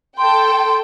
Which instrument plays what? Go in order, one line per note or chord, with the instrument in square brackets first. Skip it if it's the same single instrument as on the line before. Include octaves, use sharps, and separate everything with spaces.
[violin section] A4 G5 [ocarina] C6